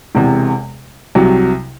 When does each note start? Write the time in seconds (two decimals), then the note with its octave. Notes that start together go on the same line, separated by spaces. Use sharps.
0.15 E1 E2 C3
1.15 C2 C3 F#3